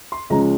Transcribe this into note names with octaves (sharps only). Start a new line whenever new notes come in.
C6
C#2 C#3 F3 G#3 C#4 A#5